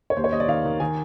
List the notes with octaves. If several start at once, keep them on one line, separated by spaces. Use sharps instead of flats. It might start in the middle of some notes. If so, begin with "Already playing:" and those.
C#5
D#2 C5
C#5
D#2 D#5
D5
D#3 F5
D#3
D#3 G#5